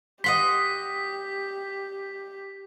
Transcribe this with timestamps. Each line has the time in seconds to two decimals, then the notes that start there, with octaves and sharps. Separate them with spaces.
0.24 G4 D#5 F#5 C6 B6